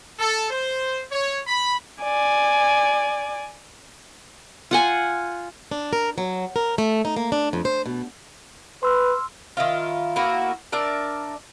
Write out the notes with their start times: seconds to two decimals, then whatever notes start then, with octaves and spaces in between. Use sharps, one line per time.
0.19 A4
0.51 C5
1.12 C#5
1.47 B5
2.03 D5 G#5
4.71 F4 F#5 G#5
5.71 D4
5.93 A#4
6.18 F#3
6.56 A#4
6.78 A3
7.05 D#4
7.16 A#3
7.32 D4
7.53 F2
7.65 C5
7.86 B2
8.83 B4 C6 E6 F6
9.57 D#3 E4 F4
10.16 A#3 B3 E4 F#4
10.72 D4 A#4 D5 E5